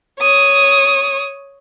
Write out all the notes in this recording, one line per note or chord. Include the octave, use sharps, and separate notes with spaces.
C#5 D#6